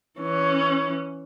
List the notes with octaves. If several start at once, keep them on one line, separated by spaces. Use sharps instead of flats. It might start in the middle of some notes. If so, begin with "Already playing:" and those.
E3 C#4